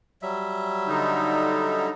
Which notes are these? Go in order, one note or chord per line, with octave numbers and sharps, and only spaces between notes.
F#3 G3 E5
D3 D#4